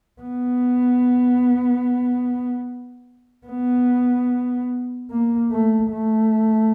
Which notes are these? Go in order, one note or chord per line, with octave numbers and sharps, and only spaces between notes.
B3
B3
A#3
A3
A3